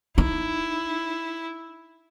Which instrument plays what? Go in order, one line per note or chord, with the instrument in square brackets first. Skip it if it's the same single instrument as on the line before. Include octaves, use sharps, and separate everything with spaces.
[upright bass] D#4 [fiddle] E4